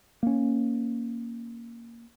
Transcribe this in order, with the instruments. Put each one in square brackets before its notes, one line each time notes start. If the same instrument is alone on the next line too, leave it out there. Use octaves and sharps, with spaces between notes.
[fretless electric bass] A#3 C#4